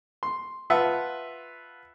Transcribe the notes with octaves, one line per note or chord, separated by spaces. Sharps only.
C6
F4 B4 E5 F#5 A5